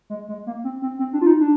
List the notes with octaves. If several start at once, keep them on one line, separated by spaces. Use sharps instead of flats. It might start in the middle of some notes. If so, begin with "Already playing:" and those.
G#3
G#3
A#3
C4
C4
C4
D4
F4
D#4
D4